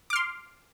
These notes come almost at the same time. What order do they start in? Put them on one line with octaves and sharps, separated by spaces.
D6 F6 C6